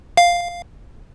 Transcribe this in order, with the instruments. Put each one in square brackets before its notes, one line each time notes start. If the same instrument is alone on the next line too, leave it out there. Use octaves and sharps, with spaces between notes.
[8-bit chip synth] F5